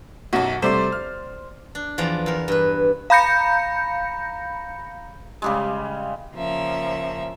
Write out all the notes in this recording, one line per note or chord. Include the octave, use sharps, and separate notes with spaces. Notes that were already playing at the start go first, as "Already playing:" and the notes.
B1 F#2 F#4 A5
C3 G3 A3 C5 D5 C6
F6
D4
E2 F3 D5 A#5
E2 A#4
G2 B4
F5 A#5 B5 G6 A#6 C#7
C#3 G3 G#3
C#3 F3 A#3 E5